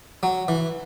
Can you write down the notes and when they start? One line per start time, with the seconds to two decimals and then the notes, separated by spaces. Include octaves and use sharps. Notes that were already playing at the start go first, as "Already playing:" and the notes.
0.23 F#3
0.48 E3